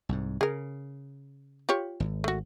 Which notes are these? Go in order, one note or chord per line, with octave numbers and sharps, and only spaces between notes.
C2 G#2
C#3 G#4 A#4
F4 G4 C#5
G#1
A3 F#4